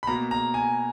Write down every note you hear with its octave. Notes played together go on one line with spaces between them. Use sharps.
B5
B2 A#3 A#5
A#5
G#5